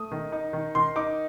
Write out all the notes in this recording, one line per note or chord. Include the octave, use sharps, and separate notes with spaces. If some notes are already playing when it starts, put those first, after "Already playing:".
Already playing: A3 D#6
D#3
D#4
D#3
D#3 C6
D#4 D6